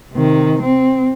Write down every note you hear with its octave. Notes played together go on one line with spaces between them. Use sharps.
C3 D#3
C4